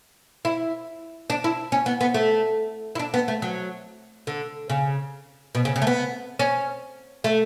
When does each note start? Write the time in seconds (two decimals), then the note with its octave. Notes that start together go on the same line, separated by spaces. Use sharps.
0.45 E4
1.30 D4
1.44 E4
1.72 C#4
1.86 B3
2.01 B3
2.14 A3
2.95 E4
3.00 D4
3.14 B3
3.28 A3
3.42 F#3
4.27 D3
4.70 C#3
5.55 B2
5.65 C#3
5.76 C#3
5.82 A3
5.87 B3
6.39 C#4
7.24 A3